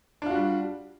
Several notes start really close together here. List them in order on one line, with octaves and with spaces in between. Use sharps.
D4 F4 F#4 G3